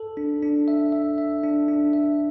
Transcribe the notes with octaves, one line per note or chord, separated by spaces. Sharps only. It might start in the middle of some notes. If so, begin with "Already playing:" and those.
Already playing: A4
D4
D4
E5
E5
E5
D4
D4
E5